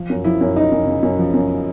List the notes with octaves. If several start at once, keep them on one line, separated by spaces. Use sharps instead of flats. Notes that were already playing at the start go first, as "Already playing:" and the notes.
Already playing: F3
F#2
F3 E4
F#2
C#3 D#4
F#2
C#3
F#2
F3
F#2